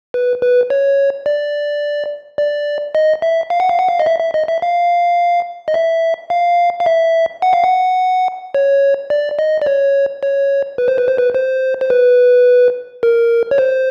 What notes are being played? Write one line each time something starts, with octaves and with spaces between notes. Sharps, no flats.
B4
B4
C#5
D5
D5
D#5
E5
F5
F#5
F5
F#5
F5
D#5
E5
E5
D#5
E5
F5
D#5
E5
F5
F5
E5
F#5
F5
F#5
C#5
D5
D#5
D5
C#5
C#5
B4
C5
B4
C5
B4
C5
C5
B4
A#4
C#5
C5